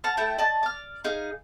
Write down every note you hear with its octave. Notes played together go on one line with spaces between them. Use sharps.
F#5 A5 F6
A3 E4 G5
D5 D#5 A5
D5 F6
D#4 G#4 F5